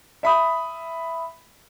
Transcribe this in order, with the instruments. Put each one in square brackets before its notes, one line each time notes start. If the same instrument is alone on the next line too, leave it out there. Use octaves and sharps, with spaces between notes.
[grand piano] E5 B5 D#6